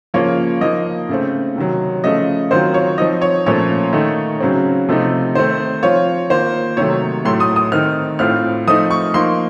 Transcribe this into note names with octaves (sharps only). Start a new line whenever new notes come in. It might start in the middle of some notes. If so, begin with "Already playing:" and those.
C#3 F3 A#3 C#4 F4 C#5
F3 A#3 D#4 D#5
C#3 A3 C4
C3 D#3 F#3
C#3 F3 A3 D#5
D#3 F#3 C4 F4 C5
C#5
F3 C4 D#4 D#5
C#5
A#2 F3 A3 C#4 C#5
D#3 A3 D#4
C#3 F#3 C4
C3 F3 A3 C4 D#4
D#3 A3 C4 C5
F3 C4 F4 C#5
D#3 A#3 F4 C5
C3 D#3 F#3 A3 C#5
A2 F#3 A3 C6
D#6
D#6
D#3 A3 C4 D#4 F6
A2 A3 C4 F4 F6
F3 A3 C4 D#4 D#6
C#6
F3 A#3 D#4 C6